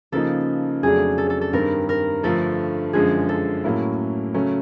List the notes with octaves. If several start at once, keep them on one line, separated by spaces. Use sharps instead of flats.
C#3 F3 A#3 D#4 A4
F2 C#3 F#3 A3 D4 G#4
A4
A4
A4
G2 D#3 G3 C4 A#4
A#4
G2 D3 F3 A3 A4
F#2 D3 F3 G#3 G#4
A4
A2 F#3 A#3 C#4 E4
C#3 F#3 A3 C#4